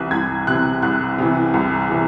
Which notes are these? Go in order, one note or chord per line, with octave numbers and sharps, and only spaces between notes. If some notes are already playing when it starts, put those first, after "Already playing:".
Already playing: C2 C3 E3 F#6
C2 G#6
C3 E3 F#6
C2 F#6
C3 E3
C2
C3 E3